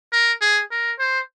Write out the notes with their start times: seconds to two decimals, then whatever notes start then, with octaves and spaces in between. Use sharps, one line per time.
0.12 A#4
0.41 G#4
0.71 A#4
0.99 C5